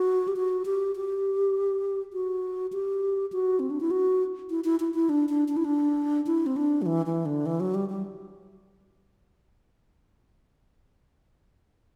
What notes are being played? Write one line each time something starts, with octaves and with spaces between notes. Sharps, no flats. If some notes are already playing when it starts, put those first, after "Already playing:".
Already playing: F#4
G4
F#4
G4
G4
F#4
G4
F#4
C4
D4
E4
F#4
E4
E4
E4
E4
D4
D4
D4
E4
D4
E4
C4
D4
F#3
E3
E3
D3
E3
F#3
G3
G3